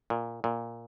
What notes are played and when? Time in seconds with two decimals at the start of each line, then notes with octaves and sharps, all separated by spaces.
0.10 A#2
0.44 A#2